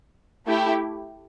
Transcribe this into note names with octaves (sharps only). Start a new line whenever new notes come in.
A3 E4 G4